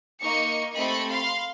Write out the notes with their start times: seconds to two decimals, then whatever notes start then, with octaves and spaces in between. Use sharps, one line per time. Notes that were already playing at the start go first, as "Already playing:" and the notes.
0.23 A#3 D#4 D#5 C#6 C#7
0.74 A3 C4 G4 D#5 B5 C#6
1.08 F5 B5 C6